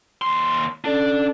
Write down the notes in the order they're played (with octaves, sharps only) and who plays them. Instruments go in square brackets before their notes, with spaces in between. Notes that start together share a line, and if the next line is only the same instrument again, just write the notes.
[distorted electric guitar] D#2 C6
[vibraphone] C#4 A4 D5 [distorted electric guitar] D4